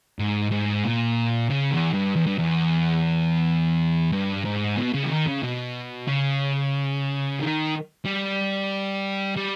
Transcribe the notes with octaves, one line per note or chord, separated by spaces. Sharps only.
G#2
G#2
A#2
C#3
E2
G2
E2
G2
E2
G2
G#2
B2
C#3
E3
D#3
C#3
B2
C#3
D#3
G3
G3